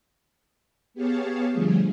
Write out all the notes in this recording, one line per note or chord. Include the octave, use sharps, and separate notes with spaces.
B3 G4 G#4 C#5 F5 A5
D3 F3 G3 A3 G#4